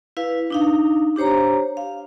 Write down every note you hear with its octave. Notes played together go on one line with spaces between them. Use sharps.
E4 B4 F5
D4 D#4 F5
D4 G4 C5 C#5 A#5
F5